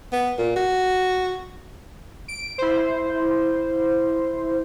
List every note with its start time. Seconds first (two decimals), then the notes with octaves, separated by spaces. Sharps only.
0.12 B3
0.38 A#2
0.56 F#4
2.28 D7
2.58 E4 C5